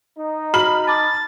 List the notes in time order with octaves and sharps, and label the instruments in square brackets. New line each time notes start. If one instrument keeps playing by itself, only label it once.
[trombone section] D#4
[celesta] F#4 [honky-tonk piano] B5 F6 F#7
[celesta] A5 D6 [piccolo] A6